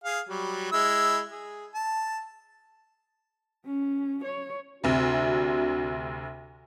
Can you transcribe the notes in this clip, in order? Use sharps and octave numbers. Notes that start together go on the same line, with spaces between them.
G#4 F5
F#3 G3
G#3 E4 E6
G#4
A5
C#4
C#5
D2 C3 D4 F#4